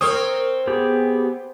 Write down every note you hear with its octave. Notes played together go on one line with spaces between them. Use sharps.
C4 A#4 C#5 D#6
B3 G4 G#4